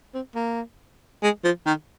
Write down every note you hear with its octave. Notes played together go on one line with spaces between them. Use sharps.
C4
A#3
G#3
F3
D#3